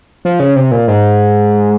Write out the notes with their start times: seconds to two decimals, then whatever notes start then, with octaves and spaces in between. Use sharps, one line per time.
0.25 F3
0.40 C#3
0.56 C3
0.71 A#2
0.88 G#2